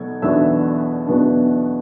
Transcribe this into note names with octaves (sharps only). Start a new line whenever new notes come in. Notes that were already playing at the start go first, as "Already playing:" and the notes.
Already playing: B2 F#3 A4 G#6
E2 B2 F#3 B3 D4 E5 E6
E2 B2 F#3 B3 D4